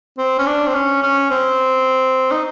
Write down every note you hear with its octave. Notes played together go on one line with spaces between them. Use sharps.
C4
C#4
D4
C4
C#4
C#4
C4
D#4